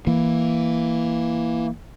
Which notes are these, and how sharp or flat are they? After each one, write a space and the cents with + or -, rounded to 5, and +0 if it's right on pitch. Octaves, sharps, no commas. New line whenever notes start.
E3 +0 A#3 +0